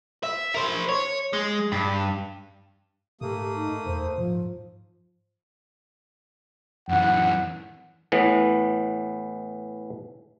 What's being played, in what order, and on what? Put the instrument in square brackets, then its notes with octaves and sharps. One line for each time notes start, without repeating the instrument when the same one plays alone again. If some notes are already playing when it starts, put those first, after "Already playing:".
[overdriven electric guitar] E5
A#4 C5
C#5
G#3
G2
[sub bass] G#2 [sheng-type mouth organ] A3 A#3 D#6 [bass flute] G4
[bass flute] D#4
[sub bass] E2 [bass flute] C5
[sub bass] G#2 [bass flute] F3
[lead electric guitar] F#2 E3 [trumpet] F#5
[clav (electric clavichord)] A2 E3 B3